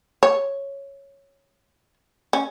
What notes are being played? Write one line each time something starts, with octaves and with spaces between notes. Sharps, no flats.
C#5
C#4